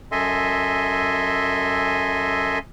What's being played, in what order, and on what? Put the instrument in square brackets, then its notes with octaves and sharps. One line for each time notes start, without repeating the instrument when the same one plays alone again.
[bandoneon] F#2 A4 D#5 E5 G#5 C6